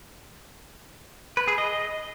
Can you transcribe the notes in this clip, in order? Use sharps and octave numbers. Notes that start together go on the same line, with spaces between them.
B4
G#4
D#5